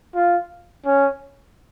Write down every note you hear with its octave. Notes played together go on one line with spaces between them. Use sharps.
F4
C#4